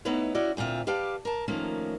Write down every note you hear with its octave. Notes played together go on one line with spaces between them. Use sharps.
A3 B3 D#4 E4 B4 C#5
C#4 E4 F#4 D5
D2 A#2 C4 F4 E5
G4 B4 D5 F5 A5
A#4 A5
D#3 F3 A3 A#3 C#4